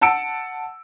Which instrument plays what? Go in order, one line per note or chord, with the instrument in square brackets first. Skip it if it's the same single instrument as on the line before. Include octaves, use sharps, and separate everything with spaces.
[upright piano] F#5 A5 E6 C#7 D7